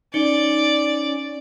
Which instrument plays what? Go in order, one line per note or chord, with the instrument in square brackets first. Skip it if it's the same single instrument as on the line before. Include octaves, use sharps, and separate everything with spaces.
[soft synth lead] C#4 [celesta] D#4 C#7 G7 [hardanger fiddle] D5